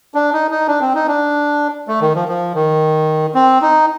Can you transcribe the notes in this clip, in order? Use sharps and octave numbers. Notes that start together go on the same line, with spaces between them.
D4
D#4
D#4
D4
C4
D#4
D4
A3
D#3
F3
F3
D#3
C4
D#4